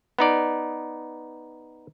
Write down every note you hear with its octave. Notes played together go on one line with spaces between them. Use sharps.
B3 D#4 D5